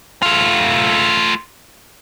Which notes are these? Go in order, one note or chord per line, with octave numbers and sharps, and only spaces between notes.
A3 F4